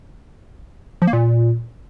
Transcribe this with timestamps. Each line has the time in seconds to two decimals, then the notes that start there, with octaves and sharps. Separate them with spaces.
1.02 F3
1.07 A#3
1.13 A#2